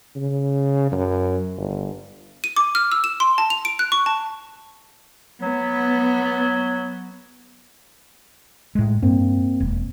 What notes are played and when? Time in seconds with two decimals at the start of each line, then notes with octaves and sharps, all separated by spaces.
0.16 C#3
0.92 F#2
1.57 G1
2.44 D#7
2.56 D6
2.75 F6
2.92 E6
3.04 E7
3.20 C6
3.38 A5
3.50 F7
3.65 D7
3.79 F#6
3.92 C#6
4.06 A5
5.41 F#3 B3
8.75 A2 G#3
9.03 G2 A#3 C4
9.60 E1